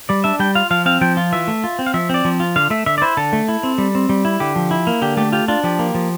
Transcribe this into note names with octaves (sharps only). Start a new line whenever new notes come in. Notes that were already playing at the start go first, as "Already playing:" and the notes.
G3 D5
D4 E5
G3 G5
F4 F5
F3 F5
C4 F5
F3 G5
F4
E3 E5
A3
F4
C4
F5
F3 E5
C4 D5
F3
F4
D3 F5
A3 E5
D3 E5
D5
E4 C5
D3 A4
A3
E4
C4
G3
C4
G3
E4
D3 G4
F3
E4
A#3
D3 G4
A3 G4
F4 G4
D4 F4
F3 G4
A#3
F3